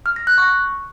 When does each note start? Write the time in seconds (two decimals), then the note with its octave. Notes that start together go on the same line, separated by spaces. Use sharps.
0.06 F6
0.16 A#6
0.27 F#6
0.38 C#6